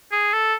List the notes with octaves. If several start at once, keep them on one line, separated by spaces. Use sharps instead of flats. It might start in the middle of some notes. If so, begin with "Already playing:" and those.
G#4
A4